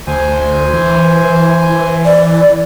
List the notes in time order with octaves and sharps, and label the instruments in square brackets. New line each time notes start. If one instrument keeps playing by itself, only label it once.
[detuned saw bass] D2 [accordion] C5 G#5
[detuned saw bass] E3
[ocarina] D5